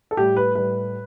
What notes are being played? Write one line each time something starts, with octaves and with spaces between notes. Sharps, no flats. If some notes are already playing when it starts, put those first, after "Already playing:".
A4
A2 G3 G4
B4
A2 G3 B4